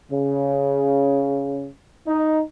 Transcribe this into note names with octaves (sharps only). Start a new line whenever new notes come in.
C#3
D#4